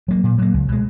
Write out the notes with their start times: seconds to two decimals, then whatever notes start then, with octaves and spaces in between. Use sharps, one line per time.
0.08 F#3 A#3
0.24 A#2
0.38 F#3 A#3
0.54 C#2
0.68 B2 G#3